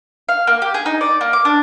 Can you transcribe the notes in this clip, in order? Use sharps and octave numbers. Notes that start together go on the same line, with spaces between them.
F5
A#3
G4
G#4
D#4
D5
A#3
D6
D4